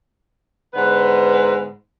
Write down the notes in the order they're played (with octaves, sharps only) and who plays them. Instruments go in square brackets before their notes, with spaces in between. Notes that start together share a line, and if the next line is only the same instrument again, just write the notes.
[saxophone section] G#2 D3 B3 B4